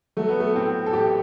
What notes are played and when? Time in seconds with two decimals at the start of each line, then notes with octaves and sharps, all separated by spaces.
0.17 F#3 A3
0.28 B3
0.40 A3
0.55 A2 C4
0.86 A4
0.93 A1 G4